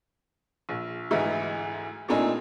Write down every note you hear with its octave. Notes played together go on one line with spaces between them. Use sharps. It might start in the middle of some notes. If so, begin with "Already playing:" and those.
A#1
D2 G#2 E3 D#4 E4
A#2 A3 C4 D4 D#4 G#5